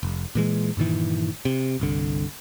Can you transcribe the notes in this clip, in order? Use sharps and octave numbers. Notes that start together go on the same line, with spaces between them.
F1
A#2 E3 G#3
G2 A#2 D#3 E3
C3
G1 C2 D3